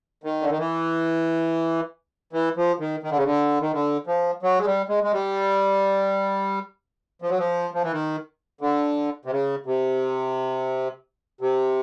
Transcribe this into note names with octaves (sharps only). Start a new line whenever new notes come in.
D#3
D3
D#3
E3
E3
F3
D#3
D#3
D3
C#3
D3
D#3
D3
F3
F#3
G#3
G3
G#3
G#3
G3
F3
F#3
F3
F3
E3
D#3
D3
C3
C#3
C3
C3